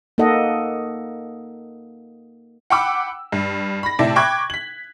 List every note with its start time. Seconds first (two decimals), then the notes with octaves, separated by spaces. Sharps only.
0.18 A#3 D#4 A4 D#5 F#5
2.70 F#5 G5 B5 D6 E6
3.32 G2
3.83 B5 A#6
3.99 A2 C3 D5 E5 A5
4.16 G5 B5 C#6 D6 F#6 G#6
4.50 B6 F#7